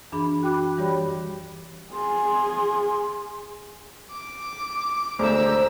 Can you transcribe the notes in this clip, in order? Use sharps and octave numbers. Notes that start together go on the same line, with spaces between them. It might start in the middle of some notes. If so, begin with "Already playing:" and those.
F#2 E3 D4 G#4 B5
F#4 G5 B5 D6 F#6
E3 G3 G4 C#5 D5 B5
G#4 C6
D6
D2 G#3 C5 A#5 E6